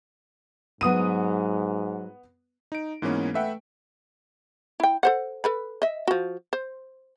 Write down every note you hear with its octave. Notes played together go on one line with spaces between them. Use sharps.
G#2 F#3 B3 F#4 D#6 D#7
D#4 D7
G#2 E3 A#3 B3 C#4
A3 B4 E5 F#5 G5
E4 G5
A4 C5 F#5
A4 B4 B5
D#5 E5
F3 F#4
C5